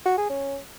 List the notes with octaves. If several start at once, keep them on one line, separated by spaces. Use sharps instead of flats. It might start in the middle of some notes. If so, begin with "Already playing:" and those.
F#4
G#4
C#4